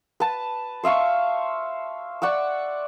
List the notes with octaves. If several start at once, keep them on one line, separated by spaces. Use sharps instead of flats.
B4 A5
C5 E5 F5 C#6
D5 F#5 C#6 E6